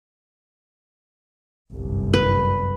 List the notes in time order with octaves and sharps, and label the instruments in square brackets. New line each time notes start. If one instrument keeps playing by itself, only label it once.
[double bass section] G1 C2 F#2
[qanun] B4